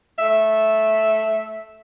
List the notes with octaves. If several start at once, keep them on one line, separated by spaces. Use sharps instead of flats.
A3 E5